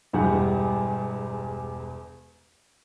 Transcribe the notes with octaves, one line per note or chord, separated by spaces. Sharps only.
E1 E2 G2 G3 G4 F#5